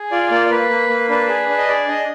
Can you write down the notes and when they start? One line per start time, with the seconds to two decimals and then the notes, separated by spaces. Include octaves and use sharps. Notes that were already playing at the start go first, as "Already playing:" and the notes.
Already playing: G#4
0.11 F4 D5
0.30 A#3 D5
0.46 D5
0.51 A#3 B4
0.70 A#3
0.89 A#3
1.09 D4 B4
1.29 G#4
1.49 D4
1.58 D#5
1.68 G#4 D5
1.88 D4 D#5